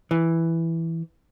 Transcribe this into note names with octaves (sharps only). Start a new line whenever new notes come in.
E3